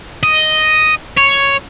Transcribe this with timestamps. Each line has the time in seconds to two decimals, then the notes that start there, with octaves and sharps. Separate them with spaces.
0.23 D#5
1.17 C#5